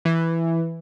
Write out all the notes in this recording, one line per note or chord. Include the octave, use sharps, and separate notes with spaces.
E3